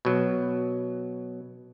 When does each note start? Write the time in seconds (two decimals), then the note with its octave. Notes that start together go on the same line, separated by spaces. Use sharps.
0.05 B2 F#3